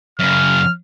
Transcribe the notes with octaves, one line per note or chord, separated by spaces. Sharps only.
F#2 C#3 F6